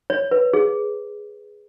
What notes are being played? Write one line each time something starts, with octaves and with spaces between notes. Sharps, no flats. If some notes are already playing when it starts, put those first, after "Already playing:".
C#5
B4
G#4